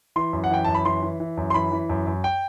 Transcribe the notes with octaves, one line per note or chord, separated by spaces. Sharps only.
E3 C6
F#2
F#5
E3 G5
F#2 A5
B5
E3 C6
E3
E3
F#2
C6
E3 B5
E3
F#2
F#2
G5